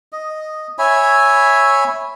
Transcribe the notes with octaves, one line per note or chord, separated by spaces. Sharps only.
D#5
C#5 E5 G#5 B5